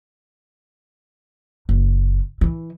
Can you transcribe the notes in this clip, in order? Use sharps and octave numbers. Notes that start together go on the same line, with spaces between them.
F#1
E3